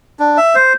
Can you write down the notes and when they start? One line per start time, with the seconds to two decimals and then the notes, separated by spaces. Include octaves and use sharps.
0.19 D4
0.37 E5
0.55 C5